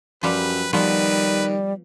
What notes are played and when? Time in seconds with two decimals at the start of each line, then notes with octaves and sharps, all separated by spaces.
0.23 F#2 F3 G3 G4 B4
0.73 D#3 F3 G3 B3 F#4 B4